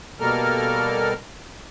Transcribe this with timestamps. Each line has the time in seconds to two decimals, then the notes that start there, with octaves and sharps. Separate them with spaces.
0.20 B2 G3 A#3 A4 A#4 F6